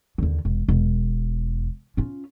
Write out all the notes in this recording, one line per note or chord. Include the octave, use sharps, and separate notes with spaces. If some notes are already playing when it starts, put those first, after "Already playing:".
D#2 D3
E1
E1
C#4 F4